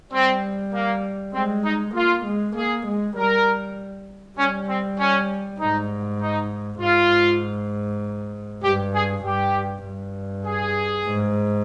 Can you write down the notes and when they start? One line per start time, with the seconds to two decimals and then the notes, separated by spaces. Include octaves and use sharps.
0.13 G3 C4
0.74 A#3
1.34 G#3 C4
1.65 D#4
1.95 A#3 F4
2.25 G#3
2.56 A#3 G#4
2.86 G#3
3.16 G3 A#4
4.38 G3 C#4
4.69 C4
4.99 C#4
5.60 G#2 D#4
6.20 D#4
6.81 G#2 F4
8.64 G2 G4
8.94 G#4
9.24 G2 G4
9.85 G2
10.46 G#4
11.07 G#2